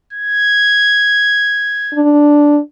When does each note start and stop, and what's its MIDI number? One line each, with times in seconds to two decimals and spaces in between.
0.13 2.01 92
1.94 2.60 62